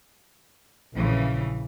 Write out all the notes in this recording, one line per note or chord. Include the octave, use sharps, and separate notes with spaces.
A#1 C#3 E3